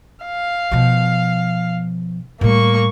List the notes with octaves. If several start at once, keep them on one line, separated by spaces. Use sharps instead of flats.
F5
B2 F3
A2 G3 A#3 C#6